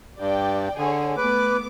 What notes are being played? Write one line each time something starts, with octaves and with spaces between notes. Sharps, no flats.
G2 D5 G5
D3 G#4 C#5
A3 B3 B4 D6